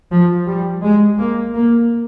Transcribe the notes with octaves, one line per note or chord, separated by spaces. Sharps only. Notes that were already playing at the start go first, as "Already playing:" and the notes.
F3
G3
G#3
A#3
A#3